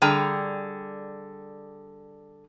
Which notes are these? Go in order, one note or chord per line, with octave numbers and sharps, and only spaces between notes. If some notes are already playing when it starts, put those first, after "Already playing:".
D3 G3 G#4 G5 A#5